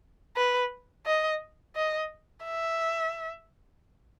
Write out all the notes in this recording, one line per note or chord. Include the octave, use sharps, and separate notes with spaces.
B4
D#5
D#5
E5